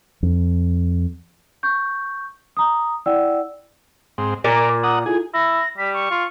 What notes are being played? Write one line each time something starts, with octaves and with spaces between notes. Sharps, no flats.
F2
C#6 G6
A#5 D#6
E4 D5 F#5 G5 E6
G#2 C4
A#2 A#4 D5
D6
F#5 A#5 D#6
E4 F4 G#4 A4
E4 A#6
G3 B6
C#6
F4